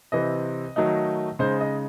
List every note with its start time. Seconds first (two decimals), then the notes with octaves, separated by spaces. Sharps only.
0.12 C3 E3 C4 D#5
0.76 D#3 F#3 A3 D#4
1.39 C#3 G#3 D#4 C5
1.61 D#5